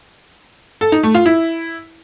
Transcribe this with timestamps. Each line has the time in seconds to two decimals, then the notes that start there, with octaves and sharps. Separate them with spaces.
0.81 A4
0.92 D#4
1.03 A3
1.15 F4
1.26 E4